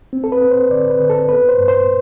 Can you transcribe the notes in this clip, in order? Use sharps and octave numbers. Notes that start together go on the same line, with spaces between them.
C4
A4
B4
C4
C5
D3 D5
B4
D3
A4
B3 B4
C5
G2
C5